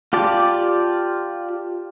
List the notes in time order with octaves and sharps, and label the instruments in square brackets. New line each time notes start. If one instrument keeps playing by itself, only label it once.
[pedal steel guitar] F4 G4 D5 A5